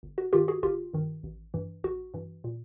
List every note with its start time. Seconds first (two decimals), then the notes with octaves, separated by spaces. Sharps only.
0.03 G1
0.18 F#4
0.32 G2 D#3 F4 G4
0.48 F#4 G#4
0.63 G1 F4 G4
0.94 G2 D#3
1.23 A1
1.54 G2 E3
1.84 A1 F#4
2.14 G2 E3
2.44 A#2